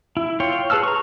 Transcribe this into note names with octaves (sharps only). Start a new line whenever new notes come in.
E4
F4 C#5 G5
G#4 B4 A5 E6 F6
A#5 C#6